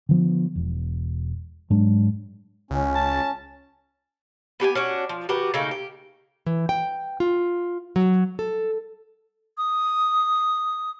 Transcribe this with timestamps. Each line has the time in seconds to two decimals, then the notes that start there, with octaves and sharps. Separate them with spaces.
0.09 D3 F3 B3
0.56 E1
1.70 G#2 F#3 G#3 D4
2.71 C#2 C#4
2.95 A5
4.60 B3 G4 F#5 G#5
4.75 C#4 D4 F#4
5.09 F3
5.29 D#3 F#4 G4 B4
5.54 C#3 A3 A#3 D#4
5.71 G4
6.46 E3
6.69 G5
7.20 F4
7.96 F#3
8.39 A4
9.58 D#6